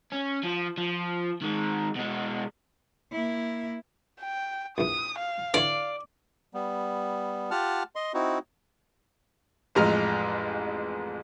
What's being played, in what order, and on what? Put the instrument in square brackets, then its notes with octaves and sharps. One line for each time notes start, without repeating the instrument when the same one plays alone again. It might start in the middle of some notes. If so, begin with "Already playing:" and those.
[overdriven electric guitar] C#4
F3
F3
D#3 G#3
B2 G#3
[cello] A#3 E4
[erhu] G5
[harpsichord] A#1 E3 [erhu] D#6
[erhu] F5
[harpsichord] D3 E3 C#5 [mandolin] D5
[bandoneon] G3 B3
F4 G4 F#5 A5 F6
D#5 C6
C4 D#4 E4 F#4
[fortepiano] A1 F2 G#3 A#5 F6